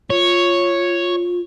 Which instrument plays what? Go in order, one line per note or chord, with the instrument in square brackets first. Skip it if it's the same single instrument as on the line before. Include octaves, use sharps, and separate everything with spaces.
[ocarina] F4 [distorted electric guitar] C#5